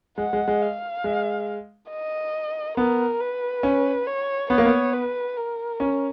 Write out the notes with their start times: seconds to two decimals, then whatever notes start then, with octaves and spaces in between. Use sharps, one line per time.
0.18 G#3 F#5
0.33 G#3
0.48 G#3
0.62 F5
1.04 G#3
1.91 D#5
2.77 B3 A#4
3.21 B4
3.63 C#4
4.07 C#5
4.50 B3 C#5
4.58 A#3
4.65 B3
4.93 B4
5.37 A#4
5.80 C#4